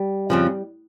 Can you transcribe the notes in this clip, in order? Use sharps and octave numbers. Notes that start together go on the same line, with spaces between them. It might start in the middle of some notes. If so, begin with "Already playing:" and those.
Already playing: G3
F2 C#3 F3